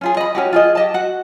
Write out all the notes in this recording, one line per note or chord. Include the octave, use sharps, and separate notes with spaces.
C#4 F4 G#4
D#5 B5
C#4 F#4 G4
F4 G#4 D#5
G4 D#5 A5
F#4 F#5